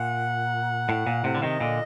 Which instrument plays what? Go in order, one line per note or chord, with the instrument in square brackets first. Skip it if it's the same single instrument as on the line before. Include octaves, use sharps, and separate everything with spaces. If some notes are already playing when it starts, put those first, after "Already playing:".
Already playing: [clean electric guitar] A#2 [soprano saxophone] F#5
[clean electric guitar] A2
A#2
A2 C3
D3
[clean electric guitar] C3 D#3 [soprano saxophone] D#5
[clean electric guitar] A#2 D3